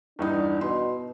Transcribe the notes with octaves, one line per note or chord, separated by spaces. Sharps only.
E2 G2 D4 D#4
B2 C6